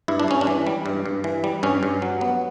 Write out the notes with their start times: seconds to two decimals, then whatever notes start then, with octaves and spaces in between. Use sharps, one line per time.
0.08 G2 E4
0.20 D4
0.28 G2 C#4
0.41 D4
0.47 E3
0.67 G3
0.86 G2
1.06 G2
1.24 E3
1.44 G3
1.63 G2 C#4
1.83 G2
2.02 F#3
2.21 B3